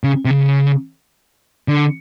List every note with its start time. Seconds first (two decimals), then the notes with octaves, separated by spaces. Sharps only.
0.04 C#3
0.25 C3
0.30 C#3
1.68 D3